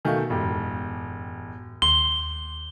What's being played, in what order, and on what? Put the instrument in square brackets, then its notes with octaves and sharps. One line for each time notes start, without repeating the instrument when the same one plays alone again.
[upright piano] B2 D#3 A3 [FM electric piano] F5 G5 G#5
[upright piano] E1 G4 [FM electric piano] F#2 A2
[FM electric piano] D#2 [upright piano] C6 [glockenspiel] G7